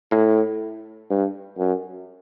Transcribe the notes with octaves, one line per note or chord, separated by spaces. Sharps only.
A2
G2
F#2